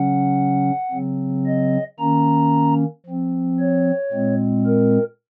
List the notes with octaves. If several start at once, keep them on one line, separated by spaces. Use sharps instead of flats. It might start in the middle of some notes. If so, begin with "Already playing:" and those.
Already playing: C#3 F#3 C#4 F#5
C#3 F#3 C4
D#5
D#3 A#3 C#4 A#5
F3 C4
C#5
A#2 G#3 C4
A#4